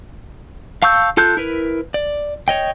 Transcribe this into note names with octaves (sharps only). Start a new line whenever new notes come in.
F5 A5 C#6 E6 G6
F4 A4 A5 F#6 G6
E4 A#4 B4
D5
C#5 D#5 G5